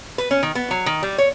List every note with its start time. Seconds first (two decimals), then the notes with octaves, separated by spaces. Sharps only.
0.18 B4
0.31 C#4
0.43 D#3
0.55 B3
0.71 F#3
0.86 D#3
1.03 G3
1.18 C#5